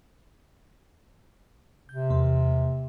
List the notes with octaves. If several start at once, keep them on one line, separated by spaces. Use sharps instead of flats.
C3 G6
E2 A#3 C6